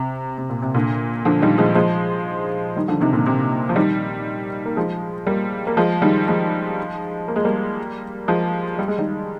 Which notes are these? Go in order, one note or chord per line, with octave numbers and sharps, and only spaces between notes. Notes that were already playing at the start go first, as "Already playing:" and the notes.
Already playing: C3
C3
A#2
C3
A#2 D3
D3 F3
D#3 G3
F3 G#3
F3 G#3
D#3 G3
D3 F3
C3 D#3
A#2 D3
C3
F3
D#3 G3
A#3
F3 G#3
G3 A#3
A#3
F3 G#3
D#3 G3
F3 G#3
A#3
G#3
G3 A#3
F3 G#3
G3
G#3
D#3 G3